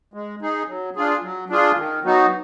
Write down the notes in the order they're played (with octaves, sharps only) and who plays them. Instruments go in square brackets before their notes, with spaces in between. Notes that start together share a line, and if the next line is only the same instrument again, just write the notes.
[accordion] G#3
D#4 G#4
F#3
D4 F4 G#4
F#3
D4 F4 G#4
D#3
F#3 B3 D#4 F#4